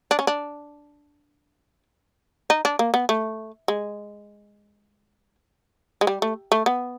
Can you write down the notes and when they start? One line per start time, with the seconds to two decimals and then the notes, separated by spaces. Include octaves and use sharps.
0.11 D4
0.19 C#4
0.27 D4
2.50 D#4
2.65 D4
2.79 A#3
2.94 B3
3.09 A3
3.68 G#3
6.01 G#3
6.07 G3
6.22 A3
6.52 A3
6.66 B3